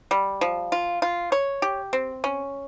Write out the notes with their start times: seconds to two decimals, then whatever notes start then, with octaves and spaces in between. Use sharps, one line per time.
0.11 G3
0.41 F3
0.72 F4
1.02 F4
1.32 C#5
1.62 G4
1.93 C4
2.24 C#4